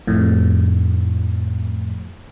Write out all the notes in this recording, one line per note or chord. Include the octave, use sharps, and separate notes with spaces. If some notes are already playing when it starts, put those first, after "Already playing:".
F2 A2